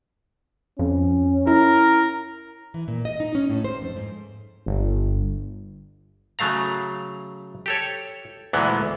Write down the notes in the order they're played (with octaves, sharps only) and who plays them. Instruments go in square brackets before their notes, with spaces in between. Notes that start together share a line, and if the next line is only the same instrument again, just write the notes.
[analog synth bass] F2 [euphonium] C#4
[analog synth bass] E4 [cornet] A#4
[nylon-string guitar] E3
A#2
D#5
D#4
C#4
A2
C5
F2
G#2
[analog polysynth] G1
[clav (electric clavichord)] C#3 F#3 A3 F5 A#5
G4 A4 C#5
D2 A#2 E3 G#3 B3